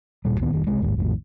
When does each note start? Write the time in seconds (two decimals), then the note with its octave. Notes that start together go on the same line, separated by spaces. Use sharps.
0.25 D#1 G2 A#2 G3
0.40 D2 A#2 D#3 B3
0.53 F1 D#3 G3
0.67 C2 C3 G#3
0.81 A1 D#2 G#2
0.96 A#1 F2 A2 D#3